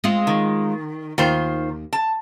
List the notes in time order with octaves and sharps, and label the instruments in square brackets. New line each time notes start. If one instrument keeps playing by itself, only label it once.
[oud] G#3 C4 F4
[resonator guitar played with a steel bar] D#3
[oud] D#2 [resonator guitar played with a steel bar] D#3 F4 C5
[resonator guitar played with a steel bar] A5